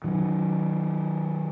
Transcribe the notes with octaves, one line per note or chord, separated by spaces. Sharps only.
D#3 F#3